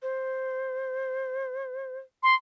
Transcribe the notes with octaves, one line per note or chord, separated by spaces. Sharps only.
C5
C6